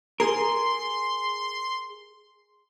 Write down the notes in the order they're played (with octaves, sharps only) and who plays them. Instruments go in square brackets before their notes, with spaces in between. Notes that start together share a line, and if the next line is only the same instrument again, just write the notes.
[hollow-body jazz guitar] G#4 A#4 [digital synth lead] C6